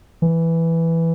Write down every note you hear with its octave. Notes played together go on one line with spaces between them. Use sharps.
E3